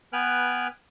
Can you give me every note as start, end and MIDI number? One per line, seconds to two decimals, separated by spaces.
0.13 0.67 59
0.13 0.67 71
0.13 0.67 79
0.13 0.67 80
0.13 0.67 89
0.13 0.67 90